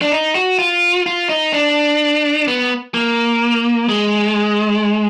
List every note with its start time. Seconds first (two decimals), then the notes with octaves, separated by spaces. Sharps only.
0.02 D4
0.12 D#4
0.35 F#4
0.59 F4
1.06 F4
1.29 D#4
1.53 D4
2.48 B3
2.94 A#3
3.89 G#3